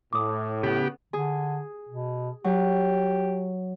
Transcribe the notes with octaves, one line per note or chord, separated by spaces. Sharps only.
A2 D6 D#6
C#3 B3 G4
D3 G#4
B2
F#3 G4